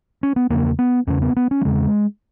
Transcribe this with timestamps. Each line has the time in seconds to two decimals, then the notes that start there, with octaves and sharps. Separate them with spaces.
0.23 C#4
0.36 B3
0.50 E2 C#3 A#3
0.79 B3
1.07 E2 C#3 C#4
1.22 B3
1.36 B3
1.51 C#4
1.61 G3
1.65 E2 C#3 G#3